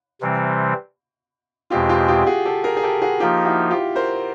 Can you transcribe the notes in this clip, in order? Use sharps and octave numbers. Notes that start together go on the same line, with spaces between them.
C3 E3 G3 C4
E2 B2 G#3 C4 F4 G4
F4 G4
F4 G4
F#4 G#4
G4 A4
G#4 A#4
G#4
G4 A4
F#4 G#4
F3 A#3 D#4 F4 G4
E4 F#4
F4 G4
A#4 C5